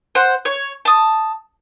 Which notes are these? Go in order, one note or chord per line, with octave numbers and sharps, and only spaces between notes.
C5 F#5
C#5
A5 D#6